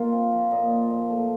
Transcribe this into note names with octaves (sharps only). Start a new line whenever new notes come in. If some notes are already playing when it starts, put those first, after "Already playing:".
Already playing: A#3 F4 D#5 F5
C4
F3
A#2 D#5
F4
A#2
A3